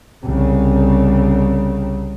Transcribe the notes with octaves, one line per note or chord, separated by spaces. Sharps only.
C2 C#3